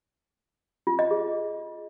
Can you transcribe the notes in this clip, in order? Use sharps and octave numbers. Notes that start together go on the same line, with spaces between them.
F4
D#5
G#4